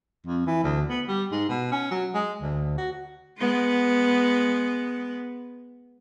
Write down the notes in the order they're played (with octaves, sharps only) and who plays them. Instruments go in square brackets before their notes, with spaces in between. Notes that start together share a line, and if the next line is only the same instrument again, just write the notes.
[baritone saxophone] F2
E3
D2
B3
G3
G#2
B2
C#4
F#3
G#3
D2
F#4
[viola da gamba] G#3 B3